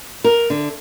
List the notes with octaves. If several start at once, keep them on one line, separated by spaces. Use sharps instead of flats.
A#4
D3